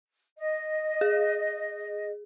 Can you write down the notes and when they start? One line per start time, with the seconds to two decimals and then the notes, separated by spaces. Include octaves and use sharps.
0.37 D#5
1.01 G#4